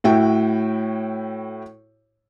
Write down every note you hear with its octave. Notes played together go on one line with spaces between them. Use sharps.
A2 E4 F#4 G5